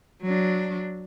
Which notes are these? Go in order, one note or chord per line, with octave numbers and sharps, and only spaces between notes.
F#3 D4